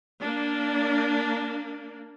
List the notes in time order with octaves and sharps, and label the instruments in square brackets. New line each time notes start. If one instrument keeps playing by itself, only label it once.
[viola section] A#3 D4